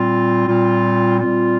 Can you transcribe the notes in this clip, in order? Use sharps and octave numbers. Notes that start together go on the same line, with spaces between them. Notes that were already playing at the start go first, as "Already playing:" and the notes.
Already playing: A#2 G3 C4 F4
A#2 G3 C4 F4
A#2 G3 C4 F4